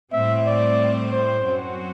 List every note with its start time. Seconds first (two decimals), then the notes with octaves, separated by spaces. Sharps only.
0.12 A2 G3 C4 E5
0.46 D5
1.12 C5
1.45 F#2 F#3 C4 F#4